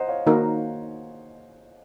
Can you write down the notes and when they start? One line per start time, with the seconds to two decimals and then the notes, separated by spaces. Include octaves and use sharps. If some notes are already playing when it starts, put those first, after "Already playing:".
Already playing: C5 D#5 F#5 A#5
0.08 C#5 F5
0.27 D#3 A#3 D#4 F#4 A#4